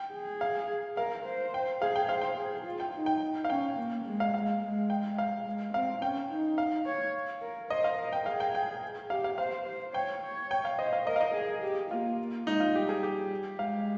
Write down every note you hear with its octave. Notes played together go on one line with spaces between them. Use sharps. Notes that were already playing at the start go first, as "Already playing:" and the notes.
Already playing: G5
G#4
F5
A#4 F5
C5
G5
G#4 F5
G5
C5 F5
G5
G#4
F4
G5
D#4
G5
F5
C#4 G5
A#3
G#3
F5
F5
G#3
G5
F5
G#3
C4 F5
C#4 G5
D#4
F5
C#5
A#4
C5 D#5
F5
A#4
G5
G#4 F5
G5
G5
G4 F5
F5
C5 F5
C5
C#5 G5
C#5
G5
F5
C5 D#5
F5
A#4 D#5
F5
D#5
G#4
G4
A#3 F4
G#3 D#4
F4
G3 G4
G#4
G4
G#3 F5